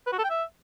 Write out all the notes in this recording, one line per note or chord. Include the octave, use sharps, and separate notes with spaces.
B4
F#4
A4
G5
E5